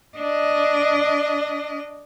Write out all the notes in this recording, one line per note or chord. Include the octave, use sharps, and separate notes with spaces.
D4 D#5